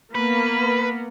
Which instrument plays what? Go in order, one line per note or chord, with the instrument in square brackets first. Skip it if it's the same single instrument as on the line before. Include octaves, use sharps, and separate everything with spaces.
[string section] A#3 B3 [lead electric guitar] B4 [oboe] B5